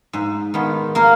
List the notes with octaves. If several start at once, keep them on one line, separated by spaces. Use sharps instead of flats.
G#2
D#3 G#3 B3
A#3 A#4